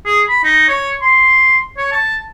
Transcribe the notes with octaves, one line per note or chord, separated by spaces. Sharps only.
G#4
B5
D#4
C#5
C6
C#5
A5